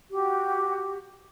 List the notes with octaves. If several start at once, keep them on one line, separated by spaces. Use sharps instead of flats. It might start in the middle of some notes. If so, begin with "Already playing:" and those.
F#4 G4